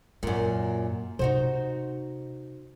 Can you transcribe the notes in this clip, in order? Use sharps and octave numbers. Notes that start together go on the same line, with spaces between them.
F#2 A#2 A#3
C3 C4 D#4 F#4 C5